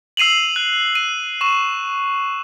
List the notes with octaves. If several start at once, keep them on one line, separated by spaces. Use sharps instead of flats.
E6 C7 D#7 F7 F#7
F#6
D#7
C#6 E7